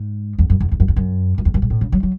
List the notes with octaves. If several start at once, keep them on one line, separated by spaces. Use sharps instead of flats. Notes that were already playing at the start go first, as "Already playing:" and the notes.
Already playing: G#2
E2
F#2
E2
E2
F#2
E2
F#2
F#2
E2
F#2
G#2
A2
C#3
F#3
F#3